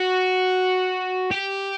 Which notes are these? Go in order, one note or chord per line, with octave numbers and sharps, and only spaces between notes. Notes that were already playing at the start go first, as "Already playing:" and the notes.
Already playing: F#4
G4